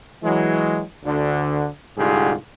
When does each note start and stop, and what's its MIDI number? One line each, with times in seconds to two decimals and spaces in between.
0.23 0.81 52
0.23 0.81 54
0.23 0.81 56
1.05 1.65 38
1.05 1.65 50
1.98 2.33 36
1.98 2.33 44
1.98 2.33 50
1.98 2.33 65
1.98 2.33 67
1.98 2.33 68